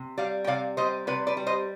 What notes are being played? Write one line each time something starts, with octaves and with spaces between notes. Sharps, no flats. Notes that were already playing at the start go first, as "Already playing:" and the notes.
Already playing: C3
G3 D5 F5
G5
C3 D5 F5
G3 C5 D#5
C3 B4 D5
B4 D5
G3
C5 D#5